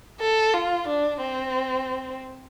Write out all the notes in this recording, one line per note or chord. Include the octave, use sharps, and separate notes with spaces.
A4
F4
D4
C4